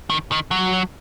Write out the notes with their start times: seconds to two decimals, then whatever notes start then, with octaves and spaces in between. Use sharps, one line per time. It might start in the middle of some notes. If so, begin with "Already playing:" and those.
0.10 D#3
0.32 D#3
0.51 F#3